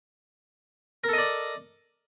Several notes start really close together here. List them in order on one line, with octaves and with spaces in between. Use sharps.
A#4 A4 D#5 D5